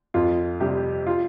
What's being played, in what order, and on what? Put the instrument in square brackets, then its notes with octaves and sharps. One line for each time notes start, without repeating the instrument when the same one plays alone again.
[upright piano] F2 F4
C3 G3 G4
F4